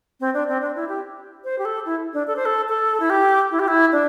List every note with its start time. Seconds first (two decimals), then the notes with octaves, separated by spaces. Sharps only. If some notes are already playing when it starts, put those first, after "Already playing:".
0.20 C4
0.34 D4
0.48 C4
0.62 D4
0.75 E4
0.89 G4
1.44 C5
1.58 G4
1.65 A4
1.85 E4
2.13 D4
2.27 A4
2.36 C5
2.45 A4
2.69 A4
3.00 E4
3.10 G4
3.51 E4
3.59 G4
3.68 E4
3.92 D4